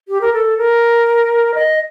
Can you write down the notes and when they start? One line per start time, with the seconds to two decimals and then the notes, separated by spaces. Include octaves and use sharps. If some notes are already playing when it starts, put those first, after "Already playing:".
0.08 G4
0.21 A#4
0.33 A4
0.58 A#4
1.54 D#5